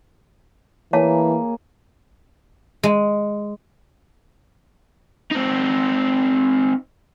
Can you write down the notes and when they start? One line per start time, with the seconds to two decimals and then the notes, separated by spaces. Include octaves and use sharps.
0.93 E3 A#3 G#4 C#5 F5 A5
2.83 G#3
5.31 C4 D#4